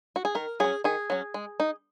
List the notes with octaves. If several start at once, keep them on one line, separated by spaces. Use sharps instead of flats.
F#4
G#4
D#3 A#4
F#3 C#4 G#4
D#3 G#4
F#3 C#4
G#3
D#4